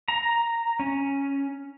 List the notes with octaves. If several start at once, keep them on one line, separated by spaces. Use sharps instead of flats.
A#5
C#4